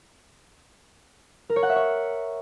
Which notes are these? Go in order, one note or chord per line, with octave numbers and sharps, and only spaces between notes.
A#4
C#5
F#5
E5
C#5